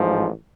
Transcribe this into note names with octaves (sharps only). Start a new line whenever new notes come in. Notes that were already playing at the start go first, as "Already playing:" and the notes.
Already playing: A1 G#2 F3